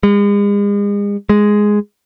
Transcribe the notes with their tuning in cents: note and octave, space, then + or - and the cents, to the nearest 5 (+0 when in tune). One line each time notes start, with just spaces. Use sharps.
G#3 -40
G#3 +0